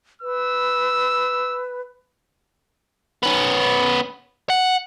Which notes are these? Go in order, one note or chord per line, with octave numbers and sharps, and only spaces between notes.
B4 E6
B3 C#4
F#5